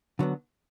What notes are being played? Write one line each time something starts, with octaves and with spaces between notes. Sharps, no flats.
D3 F#3 B3